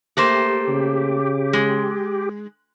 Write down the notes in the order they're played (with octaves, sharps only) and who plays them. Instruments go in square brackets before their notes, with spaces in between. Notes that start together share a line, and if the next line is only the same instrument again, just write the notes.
[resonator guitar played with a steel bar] A3 A#3 C5 [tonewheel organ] G4
[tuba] C#3
[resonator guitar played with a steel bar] G#3